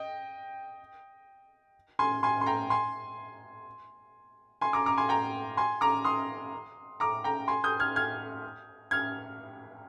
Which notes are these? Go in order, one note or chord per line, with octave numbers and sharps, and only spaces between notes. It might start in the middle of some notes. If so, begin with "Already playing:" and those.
Already playing: D#5 G5
G#5 C6
G#5 C6
C6
G5 A#5
G#5 C6
G#5 C6
A#5 D6
A#5 D6
G#5 C6
G5 A#5
G#5 C6
A#5 D6
C6 D#6
A#5 D6
G5 A#5
G#5 C6
D#6 G6
F6 G#6
F6 G#6
F6 G#6